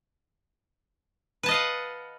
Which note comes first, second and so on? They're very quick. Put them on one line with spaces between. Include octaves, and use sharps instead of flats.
B4 A5 D#5 F5 F#5